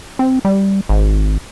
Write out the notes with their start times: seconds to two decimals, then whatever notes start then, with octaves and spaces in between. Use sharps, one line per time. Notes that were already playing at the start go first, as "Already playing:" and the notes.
0.19 C4
0.45 G3
0.89 G#1